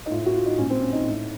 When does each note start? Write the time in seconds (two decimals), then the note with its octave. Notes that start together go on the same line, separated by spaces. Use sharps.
0.06 D#4
0.10 A2 F4
0.26 F#4
0.34 F4
0.46 D#4
0.58 A#2 C#4
0.70 C4
0.81 C#4
0.93 D#4
1.05 A2